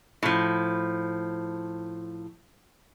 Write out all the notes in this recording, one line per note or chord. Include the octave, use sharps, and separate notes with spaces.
A2 F3